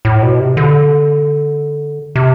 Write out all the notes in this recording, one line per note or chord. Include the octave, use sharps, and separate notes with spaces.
A2
B2
C3
D3
C3